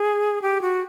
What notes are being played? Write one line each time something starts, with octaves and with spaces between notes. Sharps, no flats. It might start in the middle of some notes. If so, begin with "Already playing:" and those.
Already playing: G#4
G4
F#4